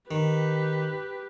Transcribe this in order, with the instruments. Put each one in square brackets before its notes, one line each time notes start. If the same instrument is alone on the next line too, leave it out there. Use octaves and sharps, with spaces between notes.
[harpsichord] D#3 [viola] G4 B4